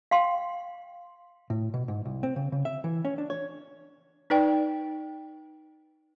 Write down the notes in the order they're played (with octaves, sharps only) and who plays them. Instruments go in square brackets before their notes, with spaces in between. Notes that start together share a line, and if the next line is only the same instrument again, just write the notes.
[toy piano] F5 G5 C6
[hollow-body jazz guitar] A2
B2
G#2
C2
C4
C#3
C#3
E5
E3
C#4
D4
C#5
[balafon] D#4 B4 D5 G5